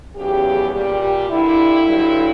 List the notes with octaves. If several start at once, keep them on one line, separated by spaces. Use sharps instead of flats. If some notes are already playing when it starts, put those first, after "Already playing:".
E2 C#3 F#3 G4
A#2 G3 G4
G4
G2 D3 G3 E4
G2 D3 F#3